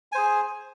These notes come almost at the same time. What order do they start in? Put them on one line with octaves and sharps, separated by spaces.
G#5 C5 G#4